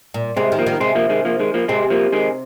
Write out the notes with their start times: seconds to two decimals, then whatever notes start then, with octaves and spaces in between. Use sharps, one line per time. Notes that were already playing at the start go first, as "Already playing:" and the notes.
0.14 A#2
0.37 C3 G#3 C4
0.52 D#3
0.59 F3 A#3
0.66 D#3
0.80 C3 G#3 C4
0.95 F3 A#3
1.10 D#3 G#3
1.25 F3 A#3
1.40 D#3 G#3
1.54 F3 A#3
1.68 C3 G#3 C4
1.90 F3 A#3
2.12 D#3 G#3